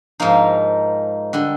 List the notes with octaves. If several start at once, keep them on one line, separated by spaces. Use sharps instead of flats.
G#2 F3 A#3 D#4
D3 G3